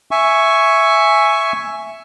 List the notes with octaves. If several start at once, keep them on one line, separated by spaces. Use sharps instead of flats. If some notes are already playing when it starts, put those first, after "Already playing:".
E5 G#5 C#6